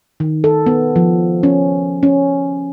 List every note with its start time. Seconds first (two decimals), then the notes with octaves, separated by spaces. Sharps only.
0.20 D#3
0.44 A4
0.66 B3
0.96 F3
1.43 C#4
2.03 C#4